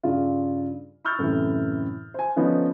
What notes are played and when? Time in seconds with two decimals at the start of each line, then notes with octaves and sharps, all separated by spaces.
0.03 G2 C#3 F4
1.05 B5 C#6 E6 F6 G6 A6
1.19 F#2 A2 C3 E3
2.14 C5 G#5
2.36 D3 F3 B3 C#4 D#4